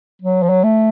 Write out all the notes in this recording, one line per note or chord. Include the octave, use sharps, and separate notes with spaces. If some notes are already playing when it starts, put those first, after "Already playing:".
F#3
F3
F#3
A3